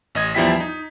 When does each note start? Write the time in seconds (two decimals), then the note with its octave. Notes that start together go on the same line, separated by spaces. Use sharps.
0.15 A1 D#5 G#6
0.35 E2 F3 G3 E4 G5 B6
0.60 D#4